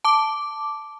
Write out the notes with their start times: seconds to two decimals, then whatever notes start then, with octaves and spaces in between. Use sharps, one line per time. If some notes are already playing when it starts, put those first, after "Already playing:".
0.04 A5 D6